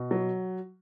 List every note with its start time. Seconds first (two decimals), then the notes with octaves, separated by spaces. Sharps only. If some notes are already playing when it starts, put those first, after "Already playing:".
Already playing: B2
0.11 F#3